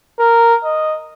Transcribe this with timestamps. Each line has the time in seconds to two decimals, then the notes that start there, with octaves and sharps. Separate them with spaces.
0.19 A#4
0.64 D#5